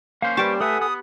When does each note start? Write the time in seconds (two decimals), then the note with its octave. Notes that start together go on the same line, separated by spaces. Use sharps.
0.22 A#3 C#4 C5 F5
0.37 G3 G4 B4 G5 A5 C#6
0.60 A3 A4 B4 E5 F#5 G#5 D#6
0.81 B3 D#6